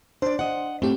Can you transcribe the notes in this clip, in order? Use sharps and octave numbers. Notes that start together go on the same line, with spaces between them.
D4 C5 D5
D#5 F#5
A2 A3 C4 G4